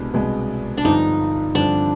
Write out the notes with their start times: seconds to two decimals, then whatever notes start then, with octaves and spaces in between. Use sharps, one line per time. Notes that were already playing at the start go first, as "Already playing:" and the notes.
Already playing: C2 B2 G#3 B3 D4
0.14 C2 B2 G#3 B3
0.77 D4
0.84 G2 D3 F3 C4 D#4
1.55 G2 D3 F3 C4 D4